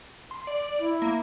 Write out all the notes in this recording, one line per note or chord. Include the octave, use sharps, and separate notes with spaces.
C6
D5
E4
A#3